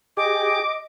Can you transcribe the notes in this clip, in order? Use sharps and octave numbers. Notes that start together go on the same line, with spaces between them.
G4 G#4 D#5 D6